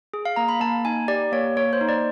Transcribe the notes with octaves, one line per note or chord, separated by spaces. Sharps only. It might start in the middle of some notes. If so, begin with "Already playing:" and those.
G#4
F5
A#3 A#5
B5
A#3 A5
D#4 G#5
G4 D5
A#3 C#5
A#3 C#5
C5
D#4
D5